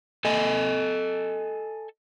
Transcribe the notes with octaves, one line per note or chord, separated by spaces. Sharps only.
A4 D#5 G#5